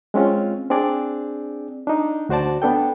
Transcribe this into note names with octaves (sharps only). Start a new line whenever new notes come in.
G#3 C4 C#4 F4
C4 D4 G#4 D5
D4 D#4
D2 F#4 C5 D5 A5
B3 D4 A4 G5